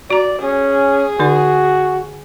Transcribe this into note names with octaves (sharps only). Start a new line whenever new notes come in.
F#4 D5 A#5
C#4 G#4
D3 D#4 F#4 D5